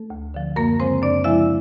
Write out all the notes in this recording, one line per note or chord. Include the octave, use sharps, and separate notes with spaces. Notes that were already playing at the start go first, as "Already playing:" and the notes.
Already playing: A3 A4
D2
D3 F3
F#2 A#3 A#4
C#3 F3 G#3 C4 C5
F#2 D4 D5
C#3 F3 G#3 E4 E5